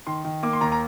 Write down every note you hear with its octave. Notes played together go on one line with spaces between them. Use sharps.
D#3 C6
D#3
A#3 D6
C6
D#2 A#5
A#5